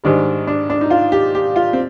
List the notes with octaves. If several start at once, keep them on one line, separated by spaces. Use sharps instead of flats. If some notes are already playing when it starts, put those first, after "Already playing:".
G#2 D#3 G3 D4
D4
D4
D#4
F4
G4
G4
F4
C4